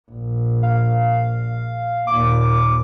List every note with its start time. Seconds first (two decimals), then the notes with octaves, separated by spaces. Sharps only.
0.11 A#1
0.63 F5
2.07 D#2 A#2 D6